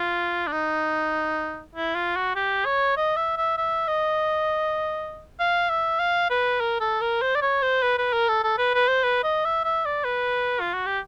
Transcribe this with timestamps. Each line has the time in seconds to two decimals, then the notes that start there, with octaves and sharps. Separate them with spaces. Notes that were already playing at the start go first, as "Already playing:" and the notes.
Already playing: F4
0.47 D4
0.53 D#4
1.76 E4
1.95 F4
2.16 F#4
2.36 G4
2.66 C#5
2.97 D#5
3.17 E5
3.37 E5
3.58 E5
3.88 D#5
5.40 F5
5.70 E5
6.00 F5
6.30 B4
6.61 A#4
6.81 A4
7.01 A#4
7.22 C5
7.36 D5
7.42 C#5
7.62 C5
7.83 B4
7.98 B4
8.13 A#4
8.29 A4
8.44 A4
8.58 B4
8.74 B4
8.88 C5
9.04 B4
9.24 D#5
9.45 E5
9.64 E5
9.85 D5
10.05 B4
10.60 F4
10.74 F#4
10.86 G4